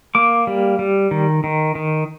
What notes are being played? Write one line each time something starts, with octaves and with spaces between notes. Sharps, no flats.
A#3 D6
G3
G3
D#3
D#3
D#3